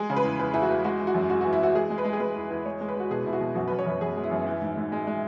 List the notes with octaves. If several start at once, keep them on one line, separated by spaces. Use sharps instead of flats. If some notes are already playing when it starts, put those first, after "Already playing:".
Already playing: G#3 G#4
C#3
B4
E2
E2 B4
E2 E4
F#4
E2
G#3 F#4
E3
F#4
F#2
G#3 F#4
F#4
E3
E4
E3 F#4
G#3 G#4
G#3
B4
G#3
G#4
G#3 B4
E2
E2
G#3 C#5
G#3
B4
G#3 F#4
B2 G#4
B2 E4
F#4
B2
F#2 F#4
B4
F#2
C#5
F#2 B4
F#2 G#4
G#3
E4
F#2
E3
G#2
G#2
G#3
G#3